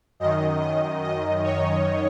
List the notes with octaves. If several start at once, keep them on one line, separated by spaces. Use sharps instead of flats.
F#2 D#3 D#5
D#5
D#5
C#5